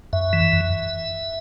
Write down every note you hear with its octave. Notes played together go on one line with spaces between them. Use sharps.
F#2 E5
E3
F#2